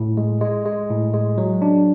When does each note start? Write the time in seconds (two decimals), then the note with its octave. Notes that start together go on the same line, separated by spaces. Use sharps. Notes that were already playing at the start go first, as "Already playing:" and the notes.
Already playing: A2
0.17 G#3
0.41 G#3
0.65 G#3
0.90 A2
1.14 G#3
1.38 F#3
1.62 D4